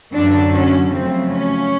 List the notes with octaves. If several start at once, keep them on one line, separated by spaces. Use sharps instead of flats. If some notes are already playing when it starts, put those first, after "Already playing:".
F#2 D3 F#3 D4
C#4
F2 C#3 F#3 A3 C4
C#4